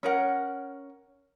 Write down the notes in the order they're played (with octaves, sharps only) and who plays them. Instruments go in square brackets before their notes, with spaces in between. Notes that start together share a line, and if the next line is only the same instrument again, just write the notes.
[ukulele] C#4 A#4 F#5